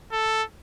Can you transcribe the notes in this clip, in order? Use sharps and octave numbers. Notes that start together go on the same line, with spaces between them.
A4